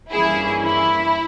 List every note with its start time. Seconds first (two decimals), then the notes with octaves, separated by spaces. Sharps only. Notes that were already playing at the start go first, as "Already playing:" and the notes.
0.12 G2 E3 A#3 C#4 E4 G#4
0.65 E4